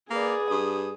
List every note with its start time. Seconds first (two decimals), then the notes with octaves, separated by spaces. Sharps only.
0.10 A#3 G#4 B4 D5
0.51 G2 D#6